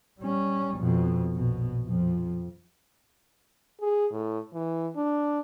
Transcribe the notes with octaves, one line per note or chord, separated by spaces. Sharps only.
G3 C#4
F2 B2
A#1 B2
F2 F3
G#4
A2
E3
D4